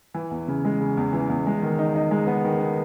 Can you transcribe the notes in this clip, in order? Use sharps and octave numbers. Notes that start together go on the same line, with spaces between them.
E3
E2
C#3
G#3
C#3
E2
E3
E2
G#3
D#3
D#4
D#4
G#3
B3
D#3
B3